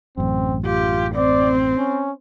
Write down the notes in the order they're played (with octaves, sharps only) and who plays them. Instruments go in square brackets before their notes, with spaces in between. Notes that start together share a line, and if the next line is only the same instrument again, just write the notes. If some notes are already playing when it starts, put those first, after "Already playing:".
[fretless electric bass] A1 F#2 [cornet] C4
[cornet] F4 [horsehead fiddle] G4
[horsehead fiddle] C4 [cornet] D5
[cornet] C#4